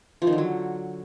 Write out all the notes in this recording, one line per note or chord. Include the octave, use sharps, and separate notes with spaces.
F3
D#3
D3
F#3